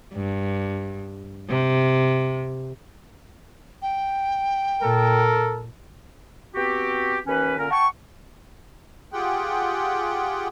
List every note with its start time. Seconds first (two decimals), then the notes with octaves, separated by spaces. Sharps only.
0.13 G2
1.49 C3
3.82 G5
4.82 A#2 A4 A#4
6.55 B3 C4 F#4 G4
7.27 D#2 E3 C#4 B4
7.58 A#2 D3 C#4 A#4
7.70 F#5 G5 A5 C#6
9.12 F4 G4 G#4 F#5 G5